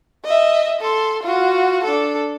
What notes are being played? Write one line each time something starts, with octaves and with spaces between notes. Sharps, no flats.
D#5 E5
A4 C6
F4 F#4
D4 A4